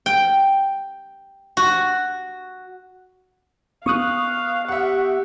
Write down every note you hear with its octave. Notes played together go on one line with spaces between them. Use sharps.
G5
F#4
B3 F5 C#6 D#6 F#6
G4 E5 F#5